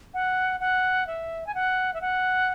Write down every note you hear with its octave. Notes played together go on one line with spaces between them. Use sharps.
F#5
F#5
E5
G#5
F#5
E5
F#5